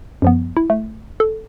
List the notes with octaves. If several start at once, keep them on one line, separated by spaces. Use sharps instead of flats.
F#2 F3 B3
E4
A3
A4